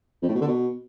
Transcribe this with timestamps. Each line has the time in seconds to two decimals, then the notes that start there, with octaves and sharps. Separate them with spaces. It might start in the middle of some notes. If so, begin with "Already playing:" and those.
0.22 F2
0.29 A2
0.35 B2
0.41 D3
0.47 B2